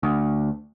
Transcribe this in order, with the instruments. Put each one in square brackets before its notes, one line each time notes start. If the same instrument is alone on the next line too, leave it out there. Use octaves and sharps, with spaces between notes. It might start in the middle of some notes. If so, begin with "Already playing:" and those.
[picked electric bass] D2